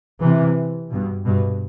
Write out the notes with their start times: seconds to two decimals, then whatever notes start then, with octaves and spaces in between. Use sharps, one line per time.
0.22 C3 E3
0.91 G2 B2
1.26 G2 B2